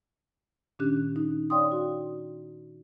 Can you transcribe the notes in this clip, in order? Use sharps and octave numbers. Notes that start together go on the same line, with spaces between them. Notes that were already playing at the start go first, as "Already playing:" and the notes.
A#2 D#3 C#4 D4 G4 F#6
D#4
C#5 D5 F5 G5 C6 D#6
F#4